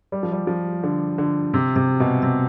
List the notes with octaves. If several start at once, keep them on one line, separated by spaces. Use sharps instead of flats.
G3
F3
G3
F3
D3
D3
C3
C3
B2
C3